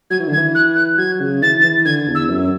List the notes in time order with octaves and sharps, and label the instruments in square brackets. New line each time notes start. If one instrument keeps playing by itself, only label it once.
[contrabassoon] F#3 [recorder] G#6
[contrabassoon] E3
D3
[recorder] G#6
[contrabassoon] E3
[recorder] F#6
F#6
[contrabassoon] F#3 [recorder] G#6
[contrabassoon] C#3
[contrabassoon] E3 [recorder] A6
[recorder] A6
[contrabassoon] E3
[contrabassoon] D3 [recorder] G#6
[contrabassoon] E2
[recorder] E6
[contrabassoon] F#2